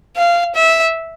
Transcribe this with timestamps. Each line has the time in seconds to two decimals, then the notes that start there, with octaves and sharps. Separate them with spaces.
0.16 F5
0.55 E5